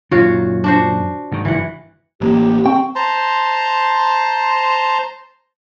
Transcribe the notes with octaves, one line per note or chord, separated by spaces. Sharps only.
F#2 A#2 D#3 F4 F#4 C#5
D4 F#4 C5
G#2 D#3
F#1 G2 E3 F#5
A1 A#3 G4
C4 G5 C#6
C5 A5 A#5 C6